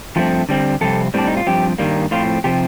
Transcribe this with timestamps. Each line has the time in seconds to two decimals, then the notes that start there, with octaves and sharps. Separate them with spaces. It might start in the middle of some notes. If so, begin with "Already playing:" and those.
0.16 G2 F3 A3 C4
0.49 D3 G3 C4
0.81 F2 C3 G3 C4 A4
1.14 A2 G3 C4 D4
1.27 D#4
1.37 F4
1.47 G2 F3 C4 G4
1.78 G2 D#3 G3 A#3
2.11 A2 F3 C4 F4
2.44 C3 F3 C4 G4